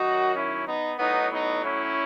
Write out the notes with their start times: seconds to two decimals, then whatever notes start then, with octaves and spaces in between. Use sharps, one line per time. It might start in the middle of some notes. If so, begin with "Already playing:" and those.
Already playing: F#2 D#3 F#3 D#4 F#4
0.34 C#4 E4
0.67 B3 D#4
0.99 A2 F#3 B3 D#4
1.31 B3 D#4
1.63 C#4 E4